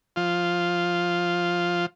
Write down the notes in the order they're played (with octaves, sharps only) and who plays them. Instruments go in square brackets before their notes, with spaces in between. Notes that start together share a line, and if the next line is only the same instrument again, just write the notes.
[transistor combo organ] F3 F4